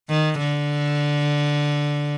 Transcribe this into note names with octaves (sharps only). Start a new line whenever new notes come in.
D#3
D3